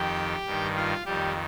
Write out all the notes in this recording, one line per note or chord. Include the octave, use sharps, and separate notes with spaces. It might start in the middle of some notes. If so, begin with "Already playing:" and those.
Already playing: F2 D#3 G4 G5
G2 D#3
F4 F5
F2 D#3 G3 G4